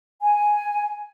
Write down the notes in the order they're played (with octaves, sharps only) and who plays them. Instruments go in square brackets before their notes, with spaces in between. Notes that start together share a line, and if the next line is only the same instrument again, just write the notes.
[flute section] G#5